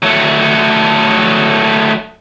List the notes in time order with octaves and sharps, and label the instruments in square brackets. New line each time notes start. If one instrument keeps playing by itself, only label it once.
[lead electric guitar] F#3 A3